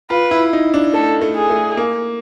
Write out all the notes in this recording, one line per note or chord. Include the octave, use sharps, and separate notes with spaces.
F4 B4
E4
D#4
D4
A3 A4
A3
G#4
A3
A#3